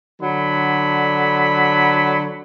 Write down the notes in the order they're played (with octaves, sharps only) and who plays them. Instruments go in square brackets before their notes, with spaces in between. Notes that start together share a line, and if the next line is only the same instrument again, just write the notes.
[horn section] D3 F#3 B5